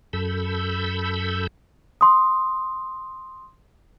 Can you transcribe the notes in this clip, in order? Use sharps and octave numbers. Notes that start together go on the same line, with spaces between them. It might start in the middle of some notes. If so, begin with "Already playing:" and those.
F#2 A4 B5 E6 G6
C6 D#6